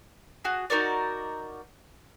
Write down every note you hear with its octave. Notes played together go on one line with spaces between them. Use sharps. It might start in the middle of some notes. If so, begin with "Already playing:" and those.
F#4 G#4
D#4 F#4 A#4 D5